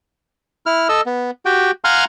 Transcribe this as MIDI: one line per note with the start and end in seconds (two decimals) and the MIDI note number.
0.66 0.88 64
0.66 0.88 89
0.89 1.01 69
0.89 1.01 75
0.89 1.01 88
1.06 1.31 59
1.45 1.71 66
1.45 1.71 67
1.45 1.71 79
1.84 2.05 77
1.84 2.05 78
1.84 2.05 80
1.84 2.05 82
1.84 2.05 84
1.84 2.05 89